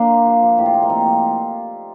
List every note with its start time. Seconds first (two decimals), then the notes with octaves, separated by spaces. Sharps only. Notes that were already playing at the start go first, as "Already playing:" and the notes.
Already playing: F3 A#3 D4 A#4 C5
0.09 A#2
0.25 F3
0.42 F3
0.57 A2 G4
0.66 F4
0.74 F3 D#4
0.82 A#3
0.90 F3 C4
1.06 F3